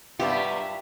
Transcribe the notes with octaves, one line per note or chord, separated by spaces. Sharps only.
G2 G3 A#3 B3 F4 G4 E5